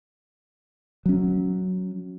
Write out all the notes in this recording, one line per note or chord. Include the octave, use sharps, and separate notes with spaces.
F#3 C#4